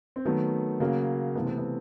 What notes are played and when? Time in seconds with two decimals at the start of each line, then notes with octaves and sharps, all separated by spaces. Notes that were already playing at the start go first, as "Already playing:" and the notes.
0.16 C4
0.25 D#3 F#3 A3 B3
0.80 C#3 F#3 A#3
1.35 C3 E3 A3 B3
1.46 C4
1.58 B3